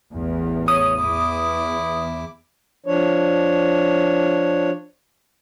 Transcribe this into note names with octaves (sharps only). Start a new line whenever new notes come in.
A1 E2
C#5 D#6
E2 E4 D6
F3 D4 C#5